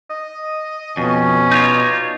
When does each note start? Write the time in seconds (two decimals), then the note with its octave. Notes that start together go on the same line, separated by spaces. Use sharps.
0.11 D#5
0.97 F2 B2 C#4
1.52 D#4 F4 C#5 D5